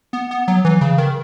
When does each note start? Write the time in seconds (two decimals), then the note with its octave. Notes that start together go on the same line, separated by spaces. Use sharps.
0.13 B3
0.31 B3
0.48 F#3
0.65 E3
0.81 C#3
0.98 D#3